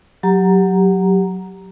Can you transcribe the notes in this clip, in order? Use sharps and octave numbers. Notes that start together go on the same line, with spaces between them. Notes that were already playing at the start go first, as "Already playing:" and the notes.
F#3 G4 A#5